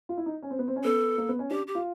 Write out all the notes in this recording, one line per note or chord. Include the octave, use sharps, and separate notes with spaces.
F4
E4
D#4
C#4
C4
B3
C4
C#4
B3 A4
A#3
B3
C#4
D4 G4
G4
F4